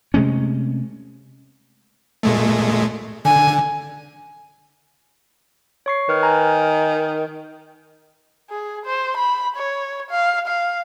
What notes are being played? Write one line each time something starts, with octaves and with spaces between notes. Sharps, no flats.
C3 G#3 A3 C#4
A#2 G#3 A3
D3 G#5
C#5 C#6 C7
D#3 B4 F6
G#5 A#5
G#4
C5
B5
C#5
F5
F5